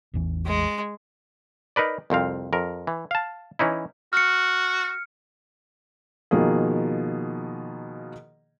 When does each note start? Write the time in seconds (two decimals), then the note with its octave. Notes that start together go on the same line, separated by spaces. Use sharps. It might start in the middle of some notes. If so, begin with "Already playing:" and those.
0.14 A1 E2 E3
0.46 G#3
1.76 D#4 A#4 B4 D5
2.10 C2 F2 C4 F5
2.53 F2 A#4
2.87 E3
3.11 F5 A5
3.59 E3 C#4 D#4 E4
4.13 F#4 F6 C#7
6.31 B2 D#3 F3 A#3 G#4